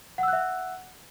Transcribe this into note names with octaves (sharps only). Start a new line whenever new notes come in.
E5 F#5 E6 F#6